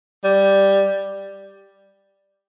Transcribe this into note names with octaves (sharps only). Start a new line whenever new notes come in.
G3